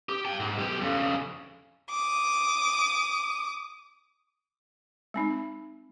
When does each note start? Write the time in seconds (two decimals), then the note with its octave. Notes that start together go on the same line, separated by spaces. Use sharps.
0.09 G4
0.25 G5 A5
0.40 G#2
0.59 B1 G4
0.81 F2 C#3
1.91 D6 D#6
5.14 G#3 C4 D#4